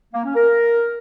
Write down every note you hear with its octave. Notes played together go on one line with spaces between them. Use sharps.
A#3
C#4
A#4